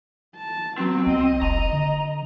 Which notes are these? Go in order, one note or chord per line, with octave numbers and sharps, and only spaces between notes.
A5
F#3 B3 C4
C2 D#5
F1 A#5
D3